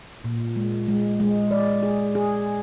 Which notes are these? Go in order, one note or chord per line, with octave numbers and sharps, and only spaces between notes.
A#2
G#3
G#3
G#3
D5
G#4
G#4